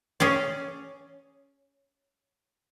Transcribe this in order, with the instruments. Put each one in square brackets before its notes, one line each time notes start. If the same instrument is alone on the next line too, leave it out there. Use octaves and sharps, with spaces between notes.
[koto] C#4 G#4 D5